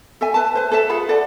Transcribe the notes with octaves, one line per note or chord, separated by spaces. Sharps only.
A4 E5 G#5
B4 A5
B4 C5
A4 B4 E5 A5
F4 G#4 F#5 B5
A4 D5 F#5